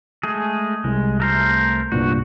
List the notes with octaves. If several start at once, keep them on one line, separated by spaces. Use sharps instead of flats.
G#3 A3 G#4
C2 G#3
A3 A#4 C5
C2 G2 A#2 F#4